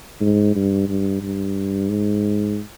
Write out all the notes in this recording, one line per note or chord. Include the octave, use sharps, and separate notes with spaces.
G#2
G2
G2
G2
G#2